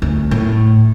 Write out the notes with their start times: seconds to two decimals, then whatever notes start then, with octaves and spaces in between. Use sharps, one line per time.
0.02 D2
0.31 A2